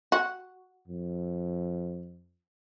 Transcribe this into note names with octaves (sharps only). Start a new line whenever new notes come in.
F#4
F2